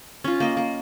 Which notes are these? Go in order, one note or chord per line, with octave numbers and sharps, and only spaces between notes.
C#4 F4
A#3 D#5
A#3